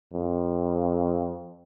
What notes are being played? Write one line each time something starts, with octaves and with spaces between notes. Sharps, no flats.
F2